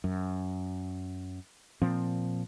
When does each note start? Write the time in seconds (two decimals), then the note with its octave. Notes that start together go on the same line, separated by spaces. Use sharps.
0.04 F#2
1.82 A#2 F3 C4